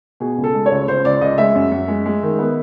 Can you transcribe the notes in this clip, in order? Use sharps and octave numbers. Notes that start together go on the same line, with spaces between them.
B2 G#4
C#2
A4
G#3
C#5
C#2
C#2 C5
C#2 D5
C#2 D#5
G#3 E5
F#2
F#2
G#3
G#3
D#3
B3